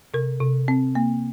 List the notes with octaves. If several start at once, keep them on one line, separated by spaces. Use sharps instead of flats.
C3 A#4
C3
C4
A#3